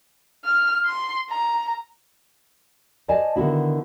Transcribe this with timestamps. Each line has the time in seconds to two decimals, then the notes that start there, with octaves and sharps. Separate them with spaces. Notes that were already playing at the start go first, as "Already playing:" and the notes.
0.45 F6
0.85 C6
1.30 A#5
3.08 C5 D5 D#5 G#5 A5
3.36 D3 D#3 B3 E4 F#4